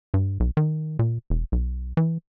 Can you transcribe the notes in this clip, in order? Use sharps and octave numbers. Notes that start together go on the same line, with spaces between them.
G2
B1
D#3
A#2
E1
B1
E3